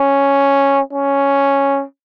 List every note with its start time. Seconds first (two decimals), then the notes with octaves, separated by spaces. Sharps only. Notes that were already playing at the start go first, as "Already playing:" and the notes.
Already playing: C#4
0.92 C#4